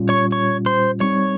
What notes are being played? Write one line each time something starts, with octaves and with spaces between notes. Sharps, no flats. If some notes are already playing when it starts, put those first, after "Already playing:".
Already playing: A#2 G3 C#4 F4
C#5 C#6
C#5 C#6
C5 C6
G3 C4 D#4 C#5 C#6